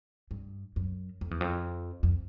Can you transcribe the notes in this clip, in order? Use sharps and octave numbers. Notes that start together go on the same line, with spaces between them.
G2
F#2
F2
E2
F2
F2